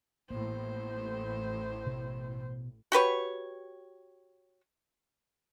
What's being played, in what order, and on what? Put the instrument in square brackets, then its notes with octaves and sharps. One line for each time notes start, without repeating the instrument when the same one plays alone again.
[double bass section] A1 A2 [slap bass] A#3 B3 [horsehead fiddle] C5
[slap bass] B2
[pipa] F#4 G4 B4 C#5